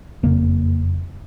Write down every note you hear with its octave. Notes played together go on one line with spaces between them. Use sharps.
F#1 F2 C#3 A#3